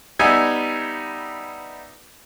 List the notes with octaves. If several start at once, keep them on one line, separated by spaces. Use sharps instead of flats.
G3 B3 D#4 E5 G#5